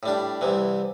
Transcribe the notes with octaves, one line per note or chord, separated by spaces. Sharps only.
A2 G3 D4
C2 C3 E3